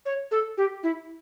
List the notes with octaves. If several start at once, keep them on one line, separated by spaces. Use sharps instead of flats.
C#5
A4
G4
E4